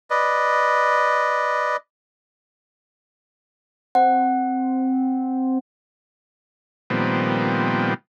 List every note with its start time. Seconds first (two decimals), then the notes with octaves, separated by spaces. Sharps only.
0.10 B4 D5 D#5
3.95 C4 F#5
6.90 A#2 D#3 F3 G3 B3 C4